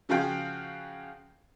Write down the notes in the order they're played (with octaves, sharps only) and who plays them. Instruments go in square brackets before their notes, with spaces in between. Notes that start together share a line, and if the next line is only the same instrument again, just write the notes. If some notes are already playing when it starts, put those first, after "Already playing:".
[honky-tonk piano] C#3 F3 F#4 G#4 F5 G5